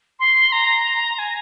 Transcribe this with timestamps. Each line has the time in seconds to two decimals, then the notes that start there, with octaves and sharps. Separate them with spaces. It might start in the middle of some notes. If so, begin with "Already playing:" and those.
0.19 C6
0.52 A#5
1.18 G#5